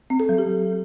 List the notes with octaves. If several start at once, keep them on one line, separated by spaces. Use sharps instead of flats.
C4
A4
F#3
G4